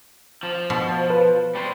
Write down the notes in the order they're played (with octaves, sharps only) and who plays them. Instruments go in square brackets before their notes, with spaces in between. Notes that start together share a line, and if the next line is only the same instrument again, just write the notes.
[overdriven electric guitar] F3
[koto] B2
[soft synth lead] B4
[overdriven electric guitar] G3 C5